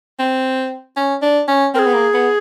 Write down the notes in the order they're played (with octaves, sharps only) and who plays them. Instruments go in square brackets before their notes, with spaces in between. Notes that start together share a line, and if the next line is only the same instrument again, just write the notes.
[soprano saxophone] C4
C#4
D4
C#4
[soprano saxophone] C4 [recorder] A#4
[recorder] G#4
[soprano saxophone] B3
A#3
B3